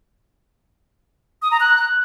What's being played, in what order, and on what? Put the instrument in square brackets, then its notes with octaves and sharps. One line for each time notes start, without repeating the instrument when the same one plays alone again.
[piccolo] D#6
A#5
F#6